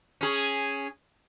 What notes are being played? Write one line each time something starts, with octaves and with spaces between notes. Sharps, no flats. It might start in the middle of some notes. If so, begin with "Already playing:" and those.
C#4 G#4